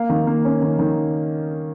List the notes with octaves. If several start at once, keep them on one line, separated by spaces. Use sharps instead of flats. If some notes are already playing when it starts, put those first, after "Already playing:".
Already playing: A#3 F5
D#3
A#3
C#4
D#3
D#3